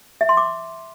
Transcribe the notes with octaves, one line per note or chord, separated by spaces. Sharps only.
E5
C6
D6